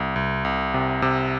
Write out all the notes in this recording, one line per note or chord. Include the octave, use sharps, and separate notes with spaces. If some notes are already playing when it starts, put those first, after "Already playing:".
Already playing: C2
C2
C2
C3
C3